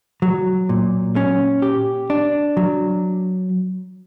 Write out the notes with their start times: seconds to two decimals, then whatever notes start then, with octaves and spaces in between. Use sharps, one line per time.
0.22 F#3
0.69 A#2
1.16 C#4
1.62 G4
2.10 D4
2.57 F#3